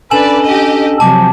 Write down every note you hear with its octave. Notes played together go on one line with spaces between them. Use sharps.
C#4 D4 A4 B4 D5 G#5 E7 F#7
G4 D#5
C3 F3 F#3 A5 D6